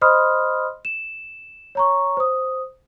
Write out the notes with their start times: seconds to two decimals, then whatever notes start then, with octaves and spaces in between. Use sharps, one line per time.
0.01 C5 D#5 B5 C6 D#6 F6
0.85 E7
1.75 C#5 A#5 C#6
2.17 C5 D#6